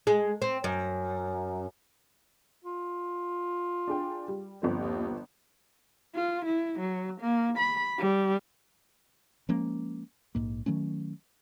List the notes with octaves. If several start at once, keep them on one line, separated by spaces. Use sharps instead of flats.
G#3
C4
F#2
F4
D4 G#4 G5
G3
G1 F3 C4
D#2
F4
E4
F#3
A#3
B5
G3
F3 G#3 A#3 C#4
A#1 G#2 A#3
D#3 F#3 A3 C#4